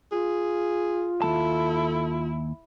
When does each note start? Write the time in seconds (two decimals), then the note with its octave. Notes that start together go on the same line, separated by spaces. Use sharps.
0.12 F4 G#4
1.22 D#2 G#3 E4 A4 A5